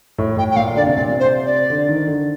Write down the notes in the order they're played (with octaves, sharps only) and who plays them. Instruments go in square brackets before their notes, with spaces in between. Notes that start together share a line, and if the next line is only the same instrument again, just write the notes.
[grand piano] A2
[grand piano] A2 [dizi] G5
[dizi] G5
[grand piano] A#2 [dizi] F5
[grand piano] D3 [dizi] D5
[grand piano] C3
[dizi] D5
[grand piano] A#2
C3
[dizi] C5
D5
[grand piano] D3
D#3
D3